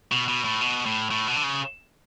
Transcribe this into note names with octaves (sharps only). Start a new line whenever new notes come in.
B2
B2
A2
B2
A2
A2
B2
D3
C#3